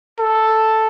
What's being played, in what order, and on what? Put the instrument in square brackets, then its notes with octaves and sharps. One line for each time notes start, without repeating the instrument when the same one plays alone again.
[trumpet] A4